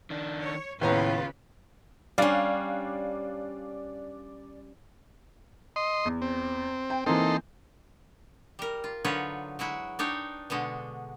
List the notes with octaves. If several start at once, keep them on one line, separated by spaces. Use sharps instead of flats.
D#3 D4
C#5
D#2 A2 C#3 B3 F4 B4 A#5
G3 C#4 D4 D5 F5
D#5 C6
E2
C4
G5
E3 A#3 C4 D#4 A4 C6
G3 A#4
F4
D3 F#3 D#4 F4 B4 C#5
F#3 G#3 E4 F#4
D4 D#4 C#5 G5
B2 D3 G#3 F#4